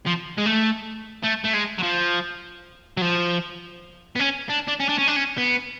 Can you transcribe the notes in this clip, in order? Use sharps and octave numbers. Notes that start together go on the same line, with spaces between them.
F3
G#3
A3
A3
A3
G#3
F#3
F3
F#3
F3
B3
C#4
D4
D4
C#4
D4
C#4
D4
C#4
B3